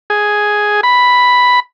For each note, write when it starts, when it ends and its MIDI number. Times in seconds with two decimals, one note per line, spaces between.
0.10 0.81 68
0.83 1.60 83